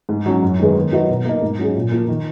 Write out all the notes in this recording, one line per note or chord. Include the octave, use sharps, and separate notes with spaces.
G#2
F#3 C#4
F#2
D#3 G#3 B3
D#3
F#3 B3 D#4 F#4
B2
A#3 D#4
G#2
F#3 C#4 G#4
A#2
F3 A#3
D#3